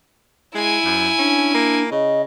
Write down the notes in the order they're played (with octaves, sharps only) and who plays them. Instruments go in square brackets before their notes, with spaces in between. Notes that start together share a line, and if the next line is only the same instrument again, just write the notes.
[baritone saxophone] G#3 [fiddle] E4 G#5
[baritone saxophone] F#2
[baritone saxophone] C#4 [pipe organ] D4
[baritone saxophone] A#3
[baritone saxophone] C#3 [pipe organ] D#5